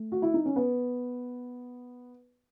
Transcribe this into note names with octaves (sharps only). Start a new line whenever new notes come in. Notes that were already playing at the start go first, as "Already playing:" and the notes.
Already playing: A3
F#4
E4
D#4
C#4
B3